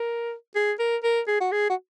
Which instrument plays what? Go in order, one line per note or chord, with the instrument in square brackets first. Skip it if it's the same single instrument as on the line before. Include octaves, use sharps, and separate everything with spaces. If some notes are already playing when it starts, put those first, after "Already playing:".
Already playing: [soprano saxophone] A#4
G#4
A#4
A#4
G#4
F#4
G#4
F#4